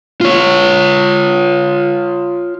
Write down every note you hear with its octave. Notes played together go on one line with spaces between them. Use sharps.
F4 C#5